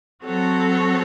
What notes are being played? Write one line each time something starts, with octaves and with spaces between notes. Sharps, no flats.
F#3 C4 F#4 A4 C#5